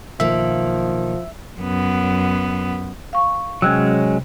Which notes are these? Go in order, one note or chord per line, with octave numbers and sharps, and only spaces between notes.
B1 D#3 F3 A#3 E5
F#2 B3
F5 C#6
C3 F#3 G#3 C#4 G5 F#6